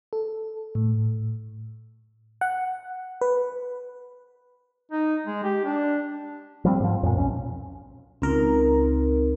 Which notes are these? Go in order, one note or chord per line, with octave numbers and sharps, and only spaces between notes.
A4
A2
F#5
B4
D#4
G#3
G4
D4
F3 G3 C4
G#2 F3
F2 A#2
B1 C#4
C#2 C4 D#4 A#4